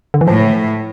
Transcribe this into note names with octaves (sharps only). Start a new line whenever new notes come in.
D3
E3
A2 F3